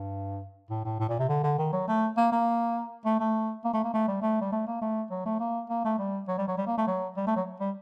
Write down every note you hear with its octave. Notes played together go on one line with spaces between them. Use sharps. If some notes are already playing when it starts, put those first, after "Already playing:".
Already playing: G2
A2
A2
A2
A#2
C3
D3
D3
D#3
F#3
A3
A#3
A#3
A3
A3
A#3
A3
A#3
A3
G3
A3
G3
A3
A#3
A3
F#3
A3
A#3
A#3
A3
G3
F#3
G3
F#3
G3
A#3
A3
F#3
G3
A3
F#3
G3